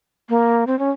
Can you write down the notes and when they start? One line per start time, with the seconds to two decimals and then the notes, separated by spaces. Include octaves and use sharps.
0.29 A#3
0.67 C4
0.79 C#4